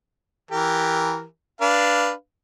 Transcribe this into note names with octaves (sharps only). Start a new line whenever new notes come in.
E3 G4 A#4
D4 B4 F5